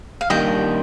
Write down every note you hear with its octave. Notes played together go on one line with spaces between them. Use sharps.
F5
D#3 G3 A#3 D4 D#5 G5